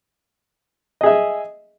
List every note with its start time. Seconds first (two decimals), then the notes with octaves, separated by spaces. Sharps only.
1.01 D#5
1.03 G#4
1.06 E5